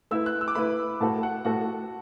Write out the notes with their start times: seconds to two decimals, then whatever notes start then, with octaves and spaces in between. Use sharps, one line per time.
0.11 A3 E4 B4 E6
0.26 F#6
0.41 E6
0.48 D6
0.55 A3 E4 B4 B5
1.00 A2 A3 F#4 A4 A5
1.23 F#5
1.45 A2 A3 F#4 A4 F#5